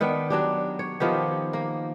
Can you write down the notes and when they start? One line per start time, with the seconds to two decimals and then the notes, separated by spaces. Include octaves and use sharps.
0.01 D#3 B3 D4 G5
0.30 F#3 D4 G4
0.79 C#5
1.00 D#3 F3 B3 G4
1.53 A#3